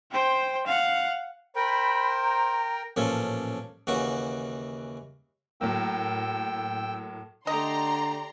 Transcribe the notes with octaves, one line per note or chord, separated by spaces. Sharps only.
C5 G5
F5 F#5
A#4 C5 G5 B5
A#5
A1 A#2 F3 C#4 A4
D#2 C#3 E3 F#4 C#6
A2 F#3 A#3 G5 E6
D3 A3 G4 D5 D#5 A#5 C6